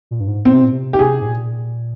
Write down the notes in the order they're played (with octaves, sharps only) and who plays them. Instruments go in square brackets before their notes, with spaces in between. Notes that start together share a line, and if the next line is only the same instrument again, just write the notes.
[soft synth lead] A#2
G2
G#2
[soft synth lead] A#2 [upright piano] C4
[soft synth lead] C3
A#2
C3
[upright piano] G4
[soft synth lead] C3 [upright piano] G#4
[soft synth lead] G#2
A#2